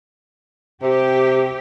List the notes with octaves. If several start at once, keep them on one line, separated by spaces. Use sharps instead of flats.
C3 G4